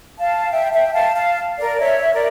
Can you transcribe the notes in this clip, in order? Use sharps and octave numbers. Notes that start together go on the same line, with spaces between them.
F5 A5
E5 G5
E5 G5
F5 A5
F5 A5
A#4 D5
C#5 E5
A#4 D5